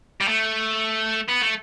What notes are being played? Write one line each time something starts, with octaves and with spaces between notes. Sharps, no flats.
G3
A3
B3
A3